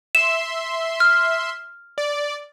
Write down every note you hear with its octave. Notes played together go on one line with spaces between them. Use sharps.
E5 C6 E7
F6
D5